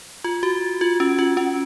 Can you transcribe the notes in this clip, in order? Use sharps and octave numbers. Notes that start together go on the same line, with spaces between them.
F4
F#4
F4
C#4
F4
C#4